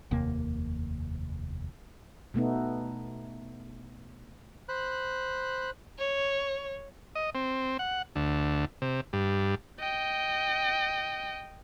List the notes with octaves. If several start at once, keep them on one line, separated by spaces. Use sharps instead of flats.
F1 D#2 C3 A#3
B2 A3 B3 D#4
C5 B5 F#6
C#5
D#5
C4
F#5
D2
C3
G2
D#5 G5